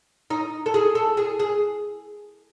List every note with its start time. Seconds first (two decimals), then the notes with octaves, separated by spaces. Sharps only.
0.30 D#4
0.66 A4
0.74 G#4
0.95 A4
1.17 G#4
1.39 G#4